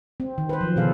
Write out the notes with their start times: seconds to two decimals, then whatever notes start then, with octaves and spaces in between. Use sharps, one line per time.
0.20 C4
0.38 D#3
0.49 B4 C5
0.61 F3 F#3
0.76 B2 D3 E3 G#4 A4 F5